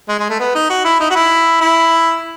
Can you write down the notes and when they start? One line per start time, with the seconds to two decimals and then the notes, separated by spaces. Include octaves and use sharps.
0.09 G#3
0.19 G#3
0.30 A3
0.40 B3
0.55 D#4
0.70 F#4
0.85 E4
1.00 D#4
1.11 F#4
1.16 E4
1.61 E4